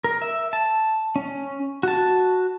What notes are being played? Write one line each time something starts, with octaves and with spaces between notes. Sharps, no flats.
A#4
E5
A5
C#4
F#4 A5